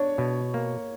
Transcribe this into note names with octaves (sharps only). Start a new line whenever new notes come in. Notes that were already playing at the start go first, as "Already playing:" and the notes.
Already playing: D4 C#5
B2
A#3